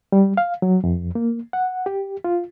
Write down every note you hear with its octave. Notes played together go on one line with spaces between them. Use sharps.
G3
F5
F#3
F2
A#3
F#5
G4
F4